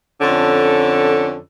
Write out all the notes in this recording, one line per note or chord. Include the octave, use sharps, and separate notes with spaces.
F2 D3 C#4 A4